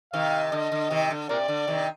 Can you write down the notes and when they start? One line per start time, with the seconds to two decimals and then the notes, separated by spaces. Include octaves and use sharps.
0.13 C3 D#3 F5
0.51 D3 D#5
0.72 D3
0.90 C3 D#3
1.10 D3
1.29 C3 A#4 D5
1.48 D3
1.67 C3 D#3